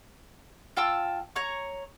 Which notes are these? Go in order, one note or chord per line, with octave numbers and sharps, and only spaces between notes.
F4 G5 A5 E6
C#5 A#5 C#6